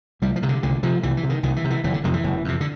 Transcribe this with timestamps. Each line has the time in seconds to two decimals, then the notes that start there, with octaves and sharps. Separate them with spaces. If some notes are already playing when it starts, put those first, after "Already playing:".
0.22 C2 G3
0.36 F3
0.42 C3 D#3
0.49 D3
0.63 C2 D3
0.83 C3 F3
1.03 C2 E3
1.17 E3
1.23 C3
1.29 D#3
1.43 C2 D#3
1.56 E3
1.64 C3
1.70 E3
1.84 F#1 E3
1.93 D3
2.04 F2 C3 D#3
2.13 E3
2.24 F#1
2.44 F2 C3
2.61 D3